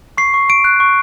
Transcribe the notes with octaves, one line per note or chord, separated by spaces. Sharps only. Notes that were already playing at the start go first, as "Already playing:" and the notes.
C#6 C7
C#6
C#6 D7
F#6
C#6